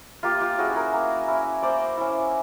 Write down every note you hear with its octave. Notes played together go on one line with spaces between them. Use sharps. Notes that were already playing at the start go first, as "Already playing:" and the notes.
A#3 F4 G4
F4 G4
C#4 E4 F#4 G#4
G#4 A#4
A#3
C#4 E4
A#3 C5 D5
C#4 E4